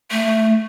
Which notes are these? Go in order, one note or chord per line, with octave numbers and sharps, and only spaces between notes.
A3